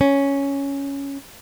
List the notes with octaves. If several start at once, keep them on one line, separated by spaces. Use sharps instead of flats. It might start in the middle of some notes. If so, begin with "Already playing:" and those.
C#4